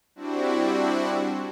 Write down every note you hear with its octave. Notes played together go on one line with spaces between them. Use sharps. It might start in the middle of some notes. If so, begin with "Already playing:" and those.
G3 C4 D4 E4 F#4